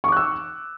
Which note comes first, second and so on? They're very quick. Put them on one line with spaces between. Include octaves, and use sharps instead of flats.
C#6 D6 F#6 E6